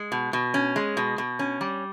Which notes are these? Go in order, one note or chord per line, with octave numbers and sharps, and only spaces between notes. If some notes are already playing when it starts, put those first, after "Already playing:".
Already playing: G#3
B2
B2
C#4
G#3
B2
B2
C#4
G3